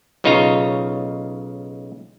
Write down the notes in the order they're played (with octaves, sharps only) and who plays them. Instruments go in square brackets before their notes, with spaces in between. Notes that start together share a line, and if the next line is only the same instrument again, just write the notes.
[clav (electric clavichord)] B1 C#3 D#4 F4 C#5 A#5